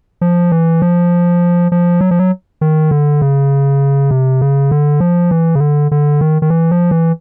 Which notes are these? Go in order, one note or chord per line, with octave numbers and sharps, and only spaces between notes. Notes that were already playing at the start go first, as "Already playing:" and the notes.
F3
E3
F3
F3
F#3
F3
F#3
D#3
D3
C#3
C3
C#3
D3
F3
E3
C#3
D3
D3
D#3
D#3
E3
F3
E3